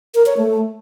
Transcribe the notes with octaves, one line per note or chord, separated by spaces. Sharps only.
A#4
C#5
A3